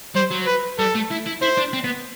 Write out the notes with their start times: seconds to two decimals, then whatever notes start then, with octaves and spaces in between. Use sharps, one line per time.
0.16 G3 C5
0.31 F#3
0.47 B4
0.79 G3 A4
0.95 A3
1.11 E4
1.26 E4
1.42 E4 C5
1.57 D4
1.73 C4
1.84 B3